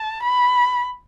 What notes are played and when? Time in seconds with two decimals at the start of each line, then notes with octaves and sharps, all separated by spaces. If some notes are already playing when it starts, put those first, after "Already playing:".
Already playing: A5
0.23 B5